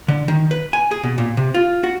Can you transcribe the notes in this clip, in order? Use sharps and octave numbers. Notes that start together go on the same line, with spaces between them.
D3
D#3
B4
G#5
G#4
B2
A#2
C3
F4
F#4